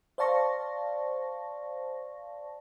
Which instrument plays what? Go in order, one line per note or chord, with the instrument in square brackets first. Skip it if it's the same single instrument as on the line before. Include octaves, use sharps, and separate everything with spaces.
[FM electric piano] C5 D5 F5 A5 C#6 A#6